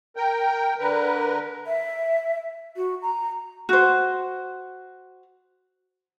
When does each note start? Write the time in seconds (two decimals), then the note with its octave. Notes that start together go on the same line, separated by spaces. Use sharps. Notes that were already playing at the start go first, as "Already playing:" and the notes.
0.16 A#4 G5
0.79 D3 A#4 B4
1.67 E5
2.76 F#4
3.02 A#5
3.69 F#4 C5